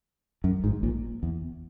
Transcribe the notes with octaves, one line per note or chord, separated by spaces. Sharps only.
F#2
G#1 G#2
A#1 A#2
E2